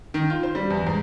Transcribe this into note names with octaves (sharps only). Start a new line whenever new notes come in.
D#3
F4
C5
G3
E2
G#2